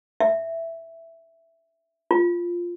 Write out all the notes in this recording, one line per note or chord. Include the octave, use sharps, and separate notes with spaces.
E5
F4